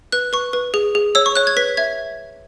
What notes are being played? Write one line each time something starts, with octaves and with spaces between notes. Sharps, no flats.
B4 F#6
B4 C#6
B4
G#4
G#4
C#5 E6
C#6
C#5 F#6
G#6
B4 B6
E5 G#6